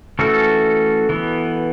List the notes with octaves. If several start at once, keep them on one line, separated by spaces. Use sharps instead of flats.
E3 A3 C#4 F#4 A4
E3 B3